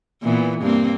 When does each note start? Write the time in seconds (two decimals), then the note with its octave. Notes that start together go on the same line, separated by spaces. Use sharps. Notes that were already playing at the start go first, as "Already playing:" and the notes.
0.22 A#2 E3 B3
0.62 G2 A#3 C4